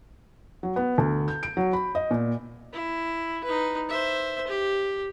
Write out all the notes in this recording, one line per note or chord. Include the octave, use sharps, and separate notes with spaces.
F#3
B3
D2
G6
D7
F#3
B5
D#5
A#2
E4
D#4 B4
C5 E5
G4